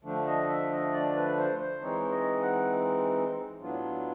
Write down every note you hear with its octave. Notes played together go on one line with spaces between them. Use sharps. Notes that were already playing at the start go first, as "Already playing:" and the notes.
D3 F3 A3 D4
D#5
E5
D#5
D5
B4
C5
C5
E3 G#3 C4 D#4 C#5
D#5
F#5
A2 F#3 B3 D4 F4